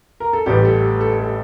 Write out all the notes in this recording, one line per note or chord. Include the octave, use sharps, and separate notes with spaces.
A#4
A4
A1 A2 E3 G3 G4
A4
A4
A4